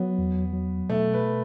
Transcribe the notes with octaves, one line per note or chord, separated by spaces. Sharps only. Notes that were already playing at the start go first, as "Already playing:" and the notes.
Already playing: F#3 B3
E2
F#3
B2 A3
B4